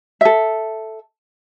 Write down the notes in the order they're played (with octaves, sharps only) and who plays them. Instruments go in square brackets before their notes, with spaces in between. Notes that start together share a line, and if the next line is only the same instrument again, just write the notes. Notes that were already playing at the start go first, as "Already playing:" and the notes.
[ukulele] A4 E5